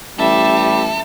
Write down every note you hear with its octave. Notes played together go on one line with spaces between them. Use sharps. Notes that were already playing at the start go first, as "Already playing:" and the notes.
A1 G3 A4 E5